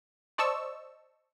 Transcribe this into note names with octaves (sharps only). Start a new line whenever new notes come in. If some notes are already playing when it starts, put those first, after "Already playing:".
C5 D5 D#5 A5 C#6 E6